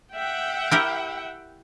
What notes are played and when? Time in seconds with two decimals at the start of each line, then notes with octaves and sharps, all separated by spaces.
0.15 E5 F#5 G5
0.71 E4 G4 A#4